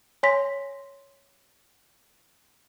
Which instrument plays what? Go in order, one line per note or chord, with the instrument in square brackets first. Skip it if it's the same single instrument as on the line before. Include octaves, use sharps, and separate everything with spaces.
[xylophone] C#5 G#5 C6 A#6 B6